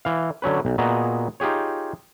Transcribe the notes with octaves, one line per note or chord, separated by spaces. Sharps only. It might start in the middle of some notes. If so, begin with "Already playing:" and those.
E3 F5
D3 F#3 C#4 B4
B1
A#2 B3 F#4 G#4 D#5 A#5
D#4 F4 G4 G#4 C#5